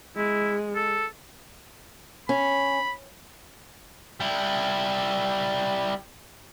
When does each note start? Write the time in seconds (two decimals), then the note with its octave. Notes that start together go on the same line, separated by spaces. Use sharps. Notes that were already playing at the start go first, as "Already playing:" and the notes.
0.16 G#3 E4
0.75 A4
2.29 C#4 B5
4.20 G3 E4